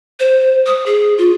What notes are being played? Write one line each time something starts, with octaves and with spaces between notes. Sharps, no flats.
C5
D#6
G#4
F4